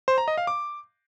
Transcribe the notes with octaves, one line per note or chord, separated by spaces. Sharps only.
C5
A#5
D#5
F5
D6